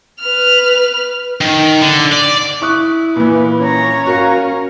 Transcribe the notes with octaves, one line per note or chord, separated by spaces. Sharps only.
B4 F6
D#3
D3
D5
E4 C#6 D#6 F#6
A#2 E3 B4
C#4 C#5 A#5
F#4 A#4 F5